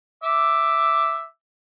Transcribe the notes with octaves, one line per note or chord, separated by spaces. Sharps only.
E5 D6